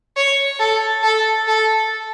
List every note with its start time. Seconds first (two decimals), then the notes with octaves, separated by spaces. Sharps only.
0.17 C#5
0.60 A4
1.03 A4
1.48 A4